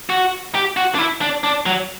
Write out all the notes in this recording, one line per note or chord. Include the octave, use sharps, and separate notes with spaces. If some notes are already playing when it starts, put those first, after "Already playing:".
F#4
G4
F#4
D4
E4
D4
D4
F#3